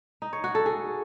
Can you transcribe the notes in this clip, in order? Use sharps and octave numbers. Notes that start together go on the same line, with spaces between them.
D#4
C#5
F#4
A4
G#4